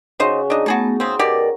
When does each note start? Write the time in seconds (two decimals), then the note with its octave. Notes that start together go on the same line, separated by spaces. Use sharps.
0.20 C#3 D#4 F#4 C5 D#5
0.50 D4 D#4 D#5
0.66 A3 B3 F#4 G#4 A5
1.00 C#3 C4 C6 D#6
1.19 B2 G4 A#4 D5